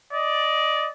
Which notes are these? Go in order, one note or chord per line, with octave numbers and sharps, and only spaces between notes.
D5 D#5